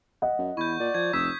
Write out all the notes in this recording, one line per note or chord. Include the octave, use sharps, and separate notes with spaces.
D#5 F#5
F#2
E2 E4 C#6 G6
A#2 D5
F3 G#6
F1 D#6 E6 B6